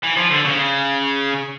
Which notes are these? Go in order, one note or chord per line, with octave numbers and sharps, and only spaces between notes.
E3
F3
D3
C#3